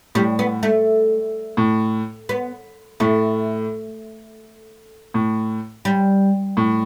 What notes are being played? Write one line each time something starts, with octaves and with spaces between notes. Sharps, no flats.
A2 G3
B3
A3
A2
B3
A2 A3
A2
G3
A2